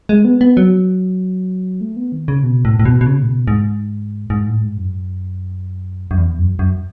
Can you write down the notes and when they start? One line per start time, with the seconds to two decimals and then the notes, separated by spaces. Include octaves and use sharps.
0.09 G#3
0.25 B3
0.41 B3
0.57 F#3
1.81 A3
1.96 B3
2.12 D#3
2.28 C#3
2.43 B2
2.65 A2
2.80 A2
2.85 B2
3.01 B2
3.06 C#3
3.23 A2
3.27 B2
3.48 G#2
4.30 G#2
4.47 A2
4.62 G#2
4.77 F#2
6.11 F#2
6.18 E2
6.39 F#2
6.59 F#2